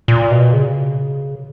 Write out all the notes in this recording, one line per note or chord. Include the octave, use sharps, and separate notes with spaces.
A#2
B2
C#3